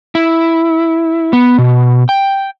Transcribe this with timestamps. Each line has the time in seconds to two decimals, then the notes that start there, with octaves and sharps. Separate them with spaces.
0.15 E4
1.33 B3
1.58 B2
2.09 G5